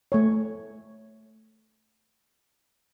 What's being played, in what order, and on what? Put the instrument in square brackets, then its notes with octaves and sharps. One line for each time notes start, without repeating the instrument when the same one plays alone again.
[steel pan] A3 C#5